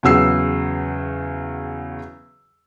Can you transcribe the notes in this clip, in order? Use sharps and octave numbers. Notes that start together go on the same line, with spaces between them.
E2 C#3 F#3 E6 C7